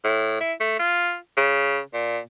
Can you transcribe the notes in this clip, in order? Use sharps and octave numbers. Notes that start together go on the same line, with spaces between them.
A2
E4
A3
F4
C#3
A#2